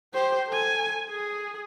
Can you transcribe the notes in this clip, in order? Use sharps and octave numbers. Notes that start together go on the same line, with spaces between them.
G4 C5
A4 G#5
G#4